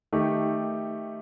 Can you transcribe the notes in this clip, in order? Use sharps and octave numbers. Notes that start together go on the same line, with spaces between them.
D#3 A3 D#4 G4